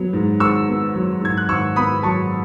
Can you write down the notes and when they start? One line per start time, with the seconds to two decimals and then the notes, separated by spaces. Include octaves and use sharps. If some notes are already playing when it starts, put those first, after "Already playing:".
Already playing: F#3 B3
0.13 G#2
0.40 G#1 C#6 E6
0.68 B3
0.95 F#3
1.22 G#2 G#6
1.37 F#6
1.48 G#1 C#6 E6
1.76 B3 B5 D#6
2.03 F#3 A5 C#6